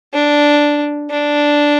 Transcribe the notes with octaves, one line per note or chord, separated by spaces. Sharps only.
D4
D4